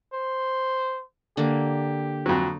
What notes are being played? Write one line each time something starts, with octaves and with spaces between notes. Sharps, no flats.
C5
D3 A#3 G4
F2 F#3